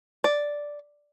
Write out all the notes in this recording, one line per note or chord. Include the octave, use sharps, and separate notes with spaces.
D5